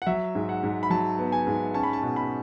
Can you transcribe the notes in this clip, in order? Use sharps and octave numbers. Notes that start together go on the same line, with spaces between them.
F#5
F#3 E5
G#2
F#5
G#2
B5
F#3 A5
B3
G#5
G#2
C#4 A5
B5
A5
B2
B5